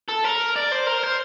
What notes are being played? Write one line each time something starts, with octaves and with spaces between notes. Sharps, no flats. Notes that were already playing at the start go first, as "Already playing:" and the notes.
A4
A#4
D5
C5
A#4
C5